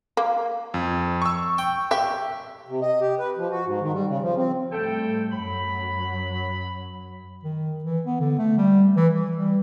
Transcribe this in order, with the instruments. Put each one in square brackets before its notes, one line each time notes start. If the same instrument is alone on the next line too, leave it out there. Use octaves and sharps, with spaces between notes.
[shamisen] A#3
[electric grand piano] F2
C#6 E6
[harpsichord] G5
[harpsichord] G4 [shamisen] E5
[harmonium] C3
D#5
G4
B4
F3
F#4
G#2
D#3
G3
C#3
F3
C4
[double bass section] A2 G3 A3 [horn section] A4 G5
[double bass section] F#2 F#3 [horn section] B5
[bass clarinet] D#3
E3
B3
D3
A3
G3
E3
E3
G3